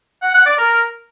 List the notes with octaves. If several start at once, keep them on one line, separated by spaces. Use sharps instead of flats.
F#5
F#5
D5
A#4